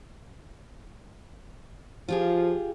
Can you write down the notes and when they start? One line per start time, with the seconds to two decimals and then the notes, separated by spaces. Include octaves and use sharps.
2.08 F3 F4 G4 G#4